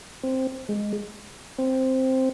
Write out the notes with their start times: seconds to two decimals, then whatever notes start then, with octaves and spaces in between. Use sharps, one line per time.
0.23 C4
0.69 G#3
1.58 C4